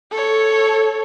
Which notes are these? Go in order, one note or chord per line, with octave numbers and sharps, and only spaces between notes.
A4 C#5